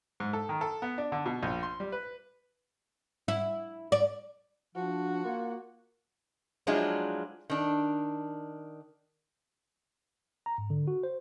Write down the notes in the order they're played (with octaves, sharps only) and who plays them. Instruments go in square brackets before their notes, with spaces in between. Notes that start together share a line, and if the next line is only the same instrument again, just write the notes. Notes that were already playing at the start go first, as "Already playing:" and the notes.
[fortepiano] G#2
A4
D#3
A4
B3
D4
D3
B2
A#1
C6
G3
B4
[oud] E4
D5
[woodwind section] F3 D4 [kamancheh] F#4
[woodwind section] A#3 F4
[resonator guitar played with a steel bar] F3 F#3 G#3 D4 E4 F4
D#3 D4
[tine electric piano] A#5
G#2
D3
F#4
C5